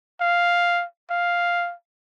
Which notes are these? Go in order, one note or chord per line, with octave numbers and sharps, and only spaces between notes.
F5
F5